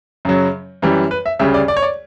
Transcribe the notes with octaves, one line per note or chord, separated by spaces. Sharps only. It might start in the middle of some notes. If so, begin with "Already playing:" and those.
F#2 C#3 F#3
F#2 E3 G3
B4
E5
D2 C#3 G3 E5
D5
D5
C#5
D5